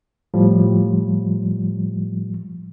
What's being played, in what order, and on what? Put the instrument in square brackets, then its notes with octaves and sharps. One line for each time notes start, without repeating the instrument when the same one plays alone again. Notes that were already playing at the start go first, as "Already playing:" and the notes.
[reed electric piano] A2 F3 G3